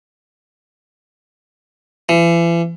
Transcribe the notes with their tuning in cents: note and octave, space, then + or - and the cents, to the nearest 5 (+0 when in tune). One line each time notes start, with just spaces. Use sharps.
E3 +40